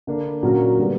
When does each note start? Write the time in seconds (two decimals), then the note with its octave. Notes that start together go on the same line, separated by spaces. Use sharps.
0.07 D3 A#3 D4
0.43 A#2 F#3 C#4 F#4 A#4
0.78 D3 G3 B3